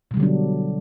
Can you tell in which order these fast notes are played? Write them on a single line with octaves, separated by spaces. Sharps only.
B2 G3 D3 F#3 D4